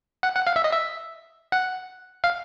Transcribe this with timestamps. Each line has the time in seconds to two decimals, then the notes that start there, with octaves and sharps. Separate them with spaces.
0.23 F#5
0.35 F#5
0.47 F5
0.56 E5
0.64 D#5
0.72 E5
1.52 F#5
2.24 F5